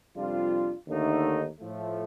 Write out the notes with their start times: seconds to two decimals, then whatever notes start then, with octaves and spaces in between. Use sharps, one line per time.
0.14 F2 C3 G3 D4 F4
0.88 D#2 D3 A3 D#4
1.60 A2 F3 A3